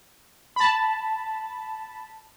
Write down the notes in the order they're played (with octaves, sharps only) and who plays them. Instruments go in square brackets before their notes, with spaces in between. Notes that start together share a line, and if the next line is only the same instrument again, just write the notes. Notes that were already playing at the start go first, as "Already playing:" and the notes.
[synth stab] A5 B5